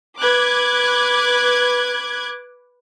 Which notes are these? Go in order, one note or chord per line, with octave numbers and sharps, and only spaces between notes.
B4 D6 F#6 G#6